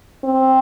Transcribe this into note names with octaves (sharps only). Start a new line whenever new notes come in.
C4